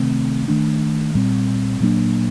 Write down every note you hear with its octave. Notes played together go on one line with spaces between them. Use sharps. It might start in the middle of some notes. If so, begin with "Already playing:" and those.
Already playing: C3 D#3 A3 C4
D#3 A3 D4
A#2 G3 C4
A#2 F#3 A#3 D4